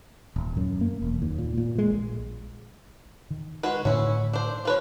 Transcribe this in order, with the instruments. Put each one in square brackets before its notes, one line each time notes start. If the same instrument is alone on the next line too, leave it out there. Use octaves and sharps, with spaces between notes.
[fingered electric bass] D#1
F#2
A#3
E1
D#2
A#2
A#2
G#3
A#1
D#3
[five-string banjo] G#3 F#4 B4
[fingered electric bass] A2 D3 D#3 [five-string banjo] C#4 E4
[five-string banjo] D4 C5
F3 B4 C#5